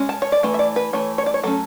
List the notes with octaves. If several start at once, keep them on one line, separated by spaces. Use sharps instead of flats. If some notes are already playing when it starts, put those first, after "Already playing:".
Already playing: G#3 C#4
A5
C#5
D5
E3 A3
E5
D5
B4
E3 A3 C#5
C#5
D5
C#5
F#3 A3 C#4 A4